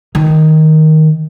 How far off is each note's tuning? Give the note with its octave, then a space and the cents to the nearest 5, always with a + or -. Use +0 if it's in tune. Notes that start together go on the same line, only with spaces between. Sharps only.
D#3 +5